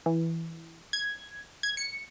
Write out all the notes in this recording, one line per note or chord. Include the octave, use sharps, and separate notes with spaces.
E3
G#6
G#6
C#7